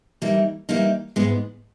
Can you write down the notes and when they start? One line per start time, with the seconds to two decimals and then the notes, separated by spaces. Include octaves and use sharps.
0.22 E3 G3 A#3 D#4
0.69 E3 G3 A#3 D#4
1.16 G#2 E3 G#3 B3